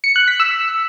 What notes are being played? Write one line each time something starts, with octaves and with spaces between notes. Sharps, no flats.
C#7
F#6
B6
E6